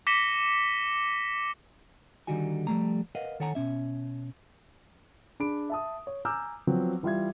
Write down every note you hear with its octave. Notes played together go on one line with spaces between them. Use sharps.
D6 A#6 B6 C#7 E7 G7
D3 D#3 G3 D#4 F#4 G#5
F3 G3 A3 A#5
A#4 B4 D#5 F5 F#5
D#3 A4 C#5 F#5 G#5 A#5
B2 C#4 E5
D4 G#4 B5 D7
E5 A5 D#6
C#5
G#5 A#5 D6 E6 F6 G6
F3 F#3 B3 C4
E3 G3 F4 E5 G#6